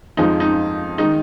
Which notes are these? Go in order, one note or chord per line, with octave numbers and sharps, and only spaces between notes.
F2 F3 G#3 D#4
D#4
D#3 G#3 D#4